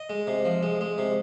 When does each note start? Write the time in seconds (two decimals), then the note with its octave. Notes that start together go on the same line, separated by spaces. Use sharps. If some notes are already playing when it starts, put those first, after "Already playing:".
Already playing: D#5
0.10 G#3
0.27 C3
0.45 F3
0.63 G#3
0.81 G#3
0.98 C3